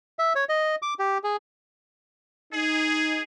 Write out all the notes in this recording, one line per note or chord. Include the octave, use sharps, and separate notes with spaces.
E5
C#5
D#5
D6
G4
G#4
D#4 G#4